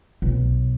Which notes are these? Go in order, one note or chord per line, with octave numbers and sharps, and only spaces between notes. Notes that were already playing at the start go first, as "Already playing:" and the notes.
B1